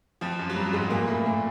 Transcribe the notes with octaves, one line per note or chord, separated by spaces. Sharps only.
F2 F3
F#2 F#3
F#3
G2 G3
G#2 G#3
A#2 A#3
A2 A3
A#2 A#3